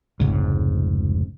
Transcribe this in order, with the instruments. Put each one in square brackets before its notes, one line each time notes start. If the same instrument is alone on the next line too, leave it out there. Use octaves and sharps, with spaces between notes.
[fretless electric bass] F1 C#2 G#2